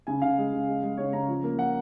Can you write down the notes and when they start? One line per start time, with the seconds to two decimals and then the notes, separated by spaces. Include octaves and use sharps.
0.07 C#3 G#5
0.22 C#3 F5
0.38 G#3
0.53 C#3
0.68 G#3
0.83 G#3
0.97 C#3 C#5
1.13 C#3 A#5
1.28 F3
1.44 A#3
1.58 F3 F#5